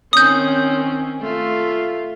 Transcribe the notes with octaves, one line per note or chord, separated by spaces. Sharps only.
D#3 C4 C#4 D#6 G6
A3 F4